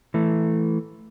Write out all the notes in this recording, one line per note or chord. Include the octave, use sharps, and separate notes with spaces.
E3 A3